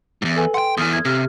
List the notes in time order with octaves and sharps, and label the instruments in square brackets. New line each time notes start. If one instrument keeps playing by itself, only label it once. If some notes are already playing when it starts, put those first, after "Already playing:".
[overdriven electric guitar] E2 G#2
[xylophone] A4 B4 G#5
[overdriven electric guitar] F#5 G5 [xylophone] C6
[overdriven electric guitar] E2 E3 [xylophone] D#6 F6
[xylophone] G#6
[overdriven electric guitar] C3 [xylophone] G4 F6